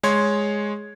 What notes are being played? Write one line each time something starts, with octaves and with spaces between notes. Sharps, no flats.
G#3 C#5 C6 G#6